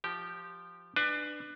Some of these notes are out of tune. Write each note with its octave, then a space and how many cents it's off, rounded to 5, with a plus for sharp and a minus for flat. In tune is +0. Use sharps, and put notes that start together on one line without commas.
F3 -5 G4 -10
D4 +25 B4 +5 G#5 +0